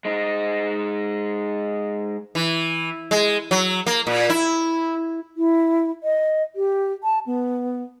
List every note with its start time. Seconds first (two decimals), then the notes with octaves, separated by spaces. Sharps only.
0.05 G#3 D#4
2.35 E3
3.11 G#3
3.51 F#3
3.87 A#3
4.07 A#2
4.30 E4
5.37 E4
6.03 D#5
6.56 G4
7.04 A5
7.26 B3